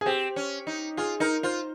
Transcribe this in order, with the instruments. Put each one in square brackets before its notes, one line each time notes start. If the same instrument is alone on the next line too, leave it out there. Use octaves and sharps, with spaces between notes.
[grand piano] G#4
[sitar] C4 [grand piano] G4
[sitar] C#4
D#4
[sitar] F4 [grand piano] G#4
[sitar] D#4 [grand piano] A#4
[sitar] F4 [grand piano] C5